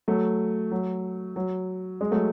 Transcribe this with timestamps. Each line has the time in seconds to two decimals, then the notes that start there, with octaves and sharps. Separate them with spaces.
0.08 F#3 A3
0.72 F#3
1.36 F#3
2.01 G#3
2.11 F#3 A3